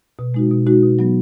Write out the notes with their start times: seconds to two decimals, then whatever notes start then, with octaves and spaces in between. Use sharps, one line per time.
0.19 B2
0.34 G#3 D#4 F#4
0.51 B2
0.66 G#3 D#4 F#4
0.82 B2
0.99 F#3 B3